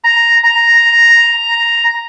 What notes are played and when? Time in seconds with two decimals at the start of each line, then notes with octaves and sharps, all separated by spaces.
0.04 A#5
0.44 A#5